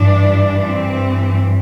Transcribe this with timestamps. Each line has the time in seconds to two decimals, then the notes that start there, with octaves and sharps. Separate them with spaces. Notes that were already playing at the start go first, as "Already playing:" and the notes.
Already playing: G2 E3 D4
0.64 C4